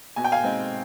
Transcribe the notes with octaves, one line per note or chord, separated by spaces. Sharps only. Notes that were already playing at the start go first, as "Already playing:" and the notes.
B2 G#5
G5
F5 G#5
G#3 C4 D#4